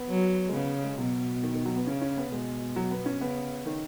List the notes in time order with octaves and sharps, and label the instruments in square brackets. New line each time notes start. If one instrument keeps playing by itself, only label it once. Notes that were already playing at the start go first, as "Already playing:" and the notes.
Already playing: [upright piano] B3
[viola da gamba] F#3
[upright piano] G#3
[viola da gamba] C#3 [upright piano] B3
[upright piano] G#3
[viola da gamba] B2 [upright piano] F#3
[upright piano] D#3
D#3
F#3
B3
[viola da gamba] C#3 [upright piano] C#4
[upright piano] C#4
B3
[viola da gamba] B2 [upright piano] G#3
[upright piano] F#3
B3
C#4
[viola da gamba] C#3 [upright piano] B3
[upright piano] D#3